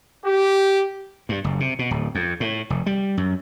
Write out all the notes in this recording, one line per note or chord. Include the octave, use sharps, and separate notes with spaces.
G4
G2
F#1
C3
B2
D1
F2
A2
F1
G3
F#2